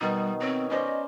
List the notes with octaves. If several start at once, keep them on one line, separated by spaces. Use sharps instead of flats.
B2 D#3 G3
C4 C#5
C#4 C5 D5 D#5